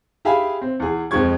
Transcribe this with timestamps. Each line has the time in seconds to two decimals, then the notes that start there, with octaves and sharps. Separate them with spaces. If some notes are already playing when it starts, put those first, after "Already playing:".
0.25 G4 G#4 E5 F5 G#5 B5
0.61 C4
0.80 E2 G#4
1.11 F2 F3 G#3 C#6 G#6